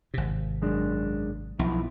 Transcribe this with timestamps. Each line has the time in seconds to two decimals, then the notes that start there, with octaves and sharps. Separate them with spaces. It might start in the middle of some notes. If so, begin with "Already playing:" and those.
0.14 G#1 C3
0.62 F#2 G#3 D4
1.59 B1 B2 F3 E4